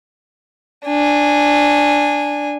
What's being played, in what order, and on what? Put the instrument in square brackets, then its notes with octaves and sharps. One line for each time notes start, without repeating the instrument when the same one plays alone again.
[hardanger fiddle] D4 G#5